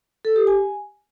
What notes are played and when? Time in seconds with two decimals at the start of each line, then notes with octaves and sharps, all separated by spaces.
0.25 A4
0.36 G4
0.47 G#5